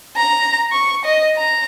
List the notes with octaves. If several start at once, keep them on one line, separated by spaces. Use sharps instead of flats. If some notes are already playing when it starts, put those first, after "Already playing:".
A#5
C#6
D#5
A#5